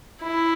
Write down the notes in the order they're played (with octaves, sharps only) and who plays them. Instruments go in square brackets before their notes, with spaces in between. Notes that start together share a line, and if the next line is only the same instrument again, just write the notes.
[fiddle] E4